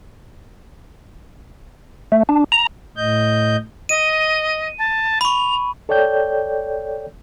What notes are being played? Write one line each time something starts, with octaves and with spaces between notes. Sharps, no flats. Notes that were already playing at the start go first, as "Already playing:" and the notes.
A3
D4
A#5
A2 D#5 G6
D#5 D#7
A5
B5 C#6 F7
A4 C#5 D5 G5 G6